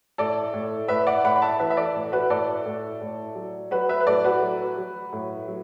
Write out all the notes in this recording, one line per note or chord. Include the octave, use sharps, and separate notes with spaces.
A2 A4 D5
A2
A2 B4 E5
D5 F#5
A2 F#5 B5
B5
E5 A5
E3 B4 E5
E5
A4 D5
A2
F#4 B4
A2 A4 D5
A2
A2
F#3
F#3 F#4 B4
B4 E5
B4
A2 A4 D5
F#4 B4
F#3
F#3
A2
F#3